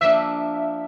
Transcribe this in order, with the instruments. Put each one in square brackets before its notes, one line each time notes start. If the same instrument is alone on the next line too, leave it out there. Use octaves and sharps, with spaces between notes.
[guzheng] F3 A#3 D4 [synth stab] E5